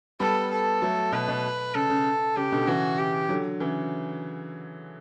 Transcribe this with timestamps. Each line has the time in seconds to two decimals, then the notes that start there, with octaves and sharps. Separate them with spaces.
0.20 G3 B3 A4
0.51 A4
0.82 F#3 A3
1.12 B2 B4
1.28 B2
1.75 C#3 A4
1.90 C#3
2.36 C#3 G4
2.52 B2 D3
2.67 C#3 E3 F#4
2.99 G4
3.29 D3 F#3
3.60 C#3 E3